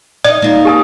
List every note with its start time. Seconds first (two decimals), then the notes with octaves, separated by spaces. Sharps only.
0.25 D#4 D5 D#5
0.42 A#3 D#4 F4
0.65 G4 G#5 D#6